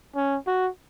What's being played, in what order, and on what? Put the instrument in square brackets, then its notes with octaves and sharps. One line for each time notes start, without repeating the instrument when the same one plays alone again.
[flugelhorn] C#4
F#4